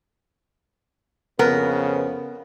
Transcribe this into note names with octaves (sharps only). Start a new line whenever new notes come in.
F2 C#3 B3 A#4 B4